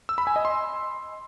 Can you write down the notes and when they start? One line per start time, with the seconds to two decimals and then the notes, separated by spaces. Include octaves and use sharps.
0.09 E6
0.18 B5
0.27 G#5
0.36 D#5
0.45 C6